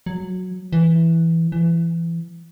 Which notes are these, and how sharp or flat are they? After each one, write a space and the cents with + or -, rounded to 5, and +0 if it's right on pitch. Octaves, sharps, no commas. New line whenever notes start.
F#3 -10
E3 +0
E3 +25